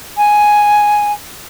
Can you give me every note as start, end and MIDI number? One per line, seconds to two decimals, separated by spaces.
0.17 1.12 80